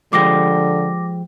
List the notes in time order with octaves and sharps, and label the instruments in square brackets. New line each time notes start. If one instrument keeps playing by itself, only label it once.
[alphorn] D3 [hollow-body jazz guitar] F3 G#3 G4 [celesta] D6 A#6